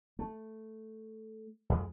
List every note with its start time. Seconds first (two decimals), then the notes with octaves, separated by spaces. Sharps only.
0.19 A3
1.70 F2 G#3